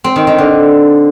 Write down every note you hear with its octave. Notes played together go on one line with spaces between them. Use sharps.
C4
D#3
D#3
D3